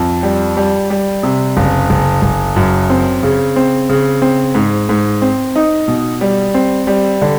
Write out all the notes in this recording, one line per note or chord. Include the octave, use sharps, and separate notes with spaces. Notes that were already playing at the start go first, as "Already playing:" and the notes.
Already playing: F2
G3
G3
G3
C3
F#1
F#1
F#1
F#2
C4
C#3
C4
C#3
C4
G#2
G#2
C4
D#4
B2
G3
C4
G3
D3